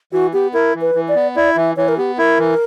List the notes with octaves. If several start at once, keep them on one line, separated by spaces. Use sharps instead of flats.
E3 F#4
B3 G4
E4 A#4
E3
B4
E3
D5
B3
E4 D5
E3 E5
E3 C#5
A#4
B3 G4
E4 A#4
E3